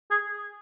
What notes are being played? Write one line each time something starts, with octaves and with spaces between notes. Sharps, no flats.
G#4